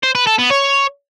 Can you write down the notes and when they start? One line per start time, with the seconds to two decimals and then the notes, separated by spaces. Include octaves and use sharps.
0.03 C5
0.15 B4
0.27 A4
0.38 B3
0.50 C#5